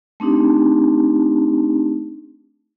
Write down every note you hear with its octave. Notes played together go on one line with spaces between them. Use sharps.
A3 C4 D4 D#4 G4